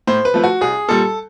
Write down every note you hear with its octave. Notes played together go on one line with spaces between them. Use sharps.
A2 C5
B4
F3 A3
F#4
C2 G#4
A#2 G3 A4